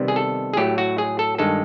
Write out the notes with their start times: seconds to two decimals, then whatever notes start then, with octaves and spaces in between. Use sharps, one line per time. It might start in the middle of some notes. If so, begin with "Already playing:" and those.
Already playing: C3 D#3 G3 B3
0.08 G#4
0.16 A4
0.53 G#4
0.57 A2 F#3 A3 G4
0.78 F#4
0.98 G#4
1.19 A4
1.38 G2 D#3 G#3 A4